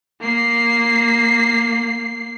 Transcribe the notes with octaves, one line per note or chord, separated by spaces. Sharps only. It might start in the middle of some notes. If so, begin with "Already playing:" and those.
A#3 C7